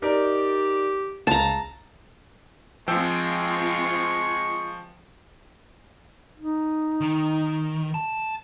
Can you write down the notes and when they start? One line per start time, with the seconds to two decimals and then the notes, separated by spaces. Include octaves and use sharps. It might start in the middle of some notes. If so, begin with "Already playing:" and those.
0.02 D#4 G4 A#4 D5
1.27 C#2 A5 A#5
2.88 F3 G#3 C4 F4 G5 C#6 E6
6.39 D#4
7.01 D#3
7.94 A5